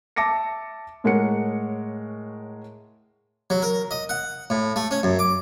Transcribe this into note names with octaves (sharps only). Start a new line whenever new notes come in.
E5 A5 D6 A#6 C#7
A2 G#3 A#4 C#5 F#5 C#7
F#3
A#4
D#5
F#5
A2
A3
C#4
F#2
D6